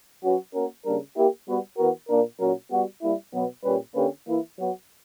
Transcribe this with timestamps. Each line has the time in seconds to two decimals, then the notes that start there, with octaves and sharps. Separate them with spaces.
0.22 F#3 C#4 F#4 B4
0.54 A#3 C#4 F#4 A#4
0.85 C#3 G3 A#3 D4 A#4
1.16 A#3 E4 G4
1.46 G3 B3 F#4 B4
1.78 E3 B3 F#4 A#4
2.09 A#2 A#3 D4 A#4
2.39 A#2 F#3 C#4 F#4 A#4
2.71 G3 B3 F#4
3.02 G3 A#3 E4
3.33 B2 F#3 B3
3.64 A#2 G3 C#4 G4 B4
3.95 D3 A#3 C#4 G4 B4
4.26 E3 A#3 E4
4.57 F#3 B3 F#4